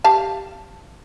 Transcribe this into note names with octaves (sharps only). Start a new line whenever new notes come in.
G4 F5 A5